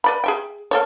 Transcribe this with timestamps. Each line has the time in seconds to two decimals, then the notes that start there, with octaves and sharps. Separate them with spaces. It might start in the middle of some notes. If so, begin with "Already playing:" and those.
0.04 B4 D5 B5
0.24 G#4 E5 G5
0.71 A#3 A4 C#5